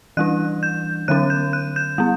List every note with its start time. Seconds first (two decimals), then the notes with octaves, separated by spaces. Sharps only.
0.17 E3 G3 D4 F#6
0.63 G6
1.08 D3 F#3 C#4 F#6
1.30 G6
1.53 F#6
1.76 G6
1.98 G3 B3